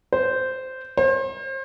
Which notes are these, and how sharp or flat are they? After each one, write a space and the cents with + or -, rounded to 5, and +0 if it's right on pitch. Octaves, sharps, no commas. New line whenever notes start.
C5 -10
C5 +35